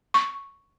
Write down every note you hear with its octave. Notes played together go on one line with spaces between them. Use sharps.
C#6